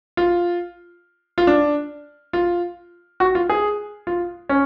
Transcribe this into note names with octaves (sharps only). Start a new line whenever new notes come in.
F4
F4
D4
F4
F#4
F4
G#4
F4
C#4